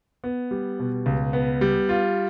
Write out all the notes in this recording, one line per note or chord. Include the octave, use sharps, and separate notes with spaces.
B3
G3
B2
C#2
B3
G3
F4